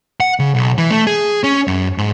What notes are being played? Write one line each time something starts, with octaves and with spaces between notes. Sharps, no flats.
F#5
C#3
B1
E3
A3
G#4
C#4
F#2
G#2